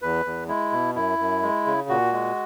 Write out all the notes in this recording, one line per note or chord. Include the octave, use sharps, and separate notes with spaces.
E2 B4
E2
G#3 E4
B2
F#2 E4
F#2
G#3
C#3
A#2 F#4
G#3